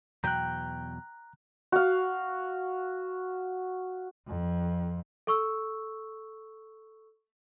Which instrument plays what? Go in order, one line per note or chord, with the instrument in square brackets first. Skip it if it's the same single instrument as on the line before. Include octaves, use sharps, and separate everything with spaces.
[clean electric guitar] E2 B2 F#3 [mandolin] G5 [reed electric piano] A#5 F#6
[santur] F#4 F5
[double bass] F2
[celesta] A4 C#6 E6